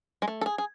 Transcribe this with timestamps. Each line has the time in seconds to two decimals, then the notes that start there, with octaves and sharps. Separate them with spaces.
0.22 G#3
0.28 A3
0.41 A4
0.46 G#4
0.58 G#4